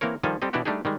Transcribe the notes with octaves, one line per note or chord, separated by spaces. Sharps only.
E3 A#3 C4 A#4 C#5
D#3 F3 G3 A4 F5 G#5
G3 C4 G4 A4 D#5
B2 E3 D4 E4 F#4 G4
G3 A3 D4 D#4 G4 G#4
D#3 G3 G#3